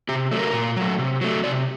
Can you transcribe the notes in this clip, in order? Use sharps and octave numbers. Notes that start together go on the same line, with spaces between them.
C3 G4
F#3 A3
A#4
A#2
F#3 A3
C3
F#3 A3
C3 D5